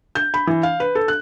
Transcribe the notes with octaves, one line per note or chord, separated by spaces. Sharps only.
G6
B5
E3
F5
B4
A4
F#6